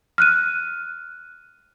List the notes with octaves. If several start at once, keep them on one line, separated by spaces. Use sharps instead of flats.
F6 F#6 D#7